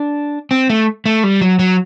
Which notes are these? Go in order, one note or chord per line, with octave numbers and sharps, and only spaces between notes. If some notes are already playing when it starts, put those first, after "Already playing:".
Already playing: D4
C4
A3
A3
G3
F#3
F#3